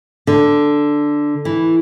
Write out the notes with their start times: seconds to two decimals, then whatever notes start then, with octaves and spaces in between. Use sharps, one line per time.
0.27 D3
1.45 E3